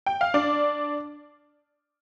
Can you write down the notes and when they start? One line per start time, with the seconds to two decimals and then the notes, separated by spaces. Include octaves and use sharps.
0.06 G5
0.21 F5
0.34 D4 D5